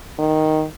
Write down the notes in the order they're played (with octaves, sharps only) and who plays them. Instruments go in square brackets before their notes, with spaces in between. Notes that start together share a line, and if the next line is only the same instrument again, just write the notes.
[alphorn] D#3